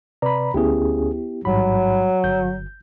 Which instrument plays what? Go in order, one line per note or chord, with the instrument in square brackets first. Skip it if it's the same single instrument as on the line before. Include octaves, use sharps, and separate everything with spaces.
[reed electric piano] C3 B4 D5 [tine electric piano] A#5 B5
[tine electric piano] D2 C#4 G#4 [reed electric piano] B3 E4 G4
[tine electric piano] A1 G#2 B5 [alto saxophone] F#3 [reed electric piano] G3
[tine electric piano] G1 [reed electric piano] G6